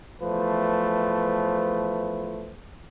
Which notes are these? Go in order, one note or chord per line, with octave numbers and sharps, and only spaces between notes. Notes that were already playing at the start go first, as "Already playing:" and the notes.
E2 F3 A3 B4 C5